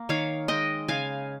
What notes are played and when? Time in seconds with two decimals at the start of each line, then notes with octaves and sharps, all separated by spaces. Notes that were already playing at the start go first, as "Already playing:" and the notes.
Already playing: A#3
0.09 D#3 C#5 F5
0.48 G#3 D#5 G5
0.88 C#3 F5 G#5